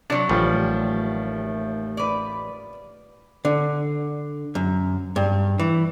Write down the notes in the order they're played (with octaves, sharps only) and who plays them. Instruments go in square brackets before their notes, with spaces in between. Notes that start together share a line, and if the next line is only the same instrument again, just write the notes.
[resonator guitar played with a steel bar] C3 F#3 [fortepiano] D4
[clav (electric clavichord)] A1 [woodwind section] D#2 A3 [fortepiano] F3 G3
[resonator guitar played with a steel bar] B4 D5
[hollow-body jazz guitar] D3
F#2
G2
E3